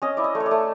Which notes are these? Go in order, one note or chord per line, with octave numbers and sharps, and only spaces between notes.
C#4 D#5
E4 D5
D#5
A3
C#5
D5
A3